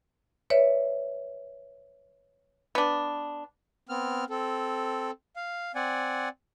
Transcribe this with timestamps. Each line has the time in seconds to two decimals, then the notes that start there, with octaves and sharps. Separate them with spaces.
0.50 B4 C#5 D5 E5
2.75 B3 D4
3.89 B3 C4 F6
4.30 C4 A4
5.36 F5
5.75 C4 D5 F#5 G#5